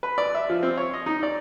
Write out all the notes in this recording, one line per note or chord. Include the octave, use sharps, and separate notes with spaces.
B4
D5
E5
F3
C4
C#5
D#5
D#4
D5